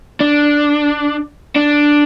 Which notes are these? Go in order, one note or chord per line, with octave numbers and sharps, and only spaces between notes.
D4
D4